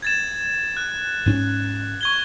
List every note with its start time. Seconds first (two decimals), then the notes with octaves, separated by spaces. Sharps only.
0.02 G#6 A6 E7
0.77 F#6
1.26 G#2 C4 C#4
2.01 C#6 G#6 G7